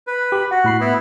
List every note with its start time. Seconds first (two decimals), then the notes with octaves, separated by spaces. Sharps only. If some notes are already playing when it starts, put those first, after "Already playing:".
0.07 B4
0.32 G4 B5
0.51 F#4 F#5
0.64 A2 B5 C7
0.80 B3 E4